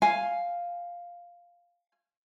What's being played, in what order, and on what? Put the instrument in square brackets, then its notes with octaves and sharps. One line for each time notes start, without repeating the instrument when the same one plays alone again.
[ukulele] F5 G#5